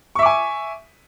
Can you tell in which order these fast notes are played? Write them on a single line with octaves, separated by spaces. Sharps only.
C#6 E5 D6 G#5